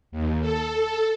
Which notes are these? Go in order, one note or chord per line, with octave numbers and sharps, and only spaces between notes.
D#2
A4